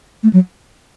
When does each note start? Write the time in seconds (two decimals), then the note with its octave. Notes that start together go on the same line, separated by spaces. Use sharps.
0.23 A3
0.33 F#3